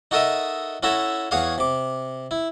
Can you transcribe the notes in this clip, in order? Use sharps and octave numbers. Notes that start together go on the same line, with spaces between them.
D#4 F#4 A4 A#4 D#5 E5
C#4 E4 F#4 A4 E5 A#5
E2 F#4 G#4 C#5 F5
C3 D6
E4